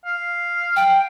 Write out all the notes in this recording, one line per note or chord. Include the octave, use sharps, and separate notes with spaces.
F5
G5